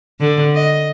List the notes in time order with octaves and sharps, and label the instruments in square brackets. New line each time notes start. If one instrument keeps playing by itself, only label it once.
[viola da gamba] D3
D#5